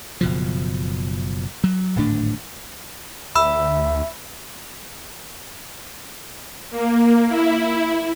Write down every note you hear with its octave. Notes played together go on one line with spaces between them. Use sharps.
F#1 B2 F3
F#3
D1 G#1 A2 D4
D2 E5 B5 E6
A#3
E4